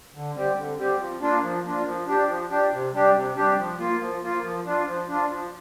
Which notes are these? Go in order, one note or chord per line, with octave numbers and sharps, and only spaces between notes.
D3
G3 C4 G4
D3
G3 C4 G4
F3
A#3 D4 F4
F3
A#3 D4 F4
F3
D4 G4
F3
D4 G4
C3
G3 D4 G4
C3
G3 D4 G4
F3
A#3 F4
F3
A#3 F4
F3
D4 F4
F3
D4 F4
F3